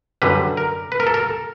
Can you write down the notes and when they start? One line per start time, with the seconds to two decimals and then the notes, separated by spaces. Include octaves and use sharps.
0.22 F#2 D3 G3 B4
0.57 A#4
0.92 B4
1.00 A#4
1.07 A4
1.14 A#4